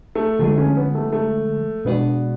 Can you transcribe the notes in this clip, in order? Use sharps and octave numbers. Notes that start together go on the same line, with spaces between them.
A3
D3 F3 G#3 A3
C#4
B3
A3
A3
B2 G#3 B3 D4 F#4